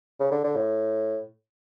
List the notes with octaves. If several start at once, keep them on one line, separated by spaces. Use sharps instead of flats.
C#3
D3
D3
A2